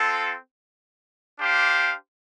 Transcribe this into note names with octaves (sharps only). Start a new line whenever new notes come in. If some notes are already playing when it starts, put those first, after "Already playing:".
Already playing: C4 F4 A4
D4 G4 C5 F5